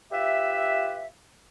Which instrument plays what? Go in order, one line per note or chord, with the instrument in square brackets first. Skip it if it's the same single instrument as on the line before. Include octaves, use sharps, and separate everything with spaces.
[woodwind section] F4 G4 B4 E5